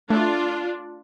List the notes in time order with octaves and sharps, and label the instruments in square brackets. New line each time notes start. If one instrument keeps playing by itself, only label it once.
[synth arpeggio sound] A3 [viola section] D4 F4